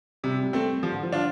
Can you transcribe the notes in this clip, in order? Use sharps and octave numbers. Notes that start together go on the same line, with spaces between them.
C3 G3
G3
A3 C4
F3 G3
D3
F3
D4 F4